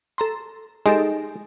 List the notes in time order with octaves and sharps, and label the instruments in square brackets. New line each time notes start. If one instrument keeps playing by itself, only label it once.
[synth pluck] A4 A#5 C6
[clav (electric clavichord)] G#3 [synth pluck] D#4 G4 A4